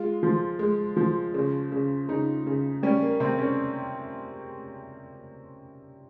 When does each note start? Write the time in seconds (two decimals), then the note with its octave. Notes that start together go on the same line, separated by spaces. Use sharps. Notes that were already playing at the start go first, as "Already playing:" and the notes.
Already playing: G#3 F4
0.23 F3
0.59 G#3
0.97 F3
1.34 C#3
1.72 C#3
2.08 C#3 D#4
2.47 C#3
2.83 G3 C#4
3.02 A#3
3.20 C3 C4
3.39 C#4